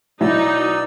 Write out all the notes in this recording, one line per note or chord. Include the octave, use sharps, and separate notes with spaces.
B2 F#3 D#4 E4 D5 E6